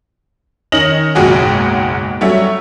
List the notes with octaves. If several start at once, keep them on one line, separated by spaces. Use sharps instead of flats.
D#3 C#4 D#5 A#6 F#7
F#1 B1 G#2 F#4 G#4 G5
F#3 G3 A3 C#4 C#5 E5